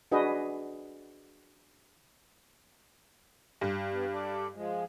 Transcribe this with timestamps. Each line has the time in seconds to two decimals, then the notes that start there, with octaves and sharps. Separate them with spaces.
0.12 D4 F#4 G#4 B4 D#5
3.61 G2
3.92 B3
4.13 A4 D5
4.54 F3 G#3